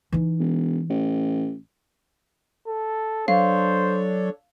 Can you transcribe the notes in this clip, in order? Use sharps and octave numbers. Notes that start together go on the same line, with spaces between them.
E3 D#4
E1
A1
A4
F#3 D4 A4 C5 C#5 F5